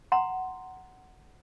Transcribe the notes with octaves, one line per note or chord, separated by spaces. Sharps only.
F#5 A#5 C6